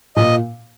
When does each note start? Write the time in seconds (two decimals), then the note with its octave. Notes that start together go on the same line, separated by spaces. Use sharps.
0.16 A#2 D#5